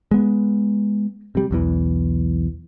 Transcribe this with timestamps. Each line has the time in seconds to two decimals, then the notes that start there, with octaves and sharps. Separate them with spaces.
0.11 G#3 B3
1.35 C3 G3
1.51 B1 E2 E3